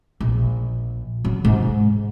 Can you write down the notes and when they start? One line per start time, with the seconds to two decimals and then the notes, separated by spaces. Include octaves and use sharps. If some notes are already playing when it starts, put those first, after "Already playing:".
0.21 A#1
1.25 F#3
1.45 G#2